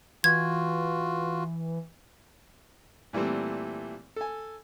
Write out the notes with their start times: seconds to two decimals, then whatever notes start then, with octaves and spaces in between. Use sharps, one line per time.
0.24 E3 F4 F#4 G#6
3.13 A#2 E3 G3 A3 C4
4.16 A4 G#5